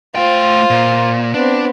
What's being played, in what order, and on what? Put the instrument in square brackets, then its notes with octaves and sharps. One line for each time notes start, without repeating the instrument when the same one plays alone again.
[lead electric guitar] A3 G5 [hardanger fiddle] F4 C5
[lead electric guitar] A#2
[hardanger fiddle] B3 C4 [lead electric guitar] D4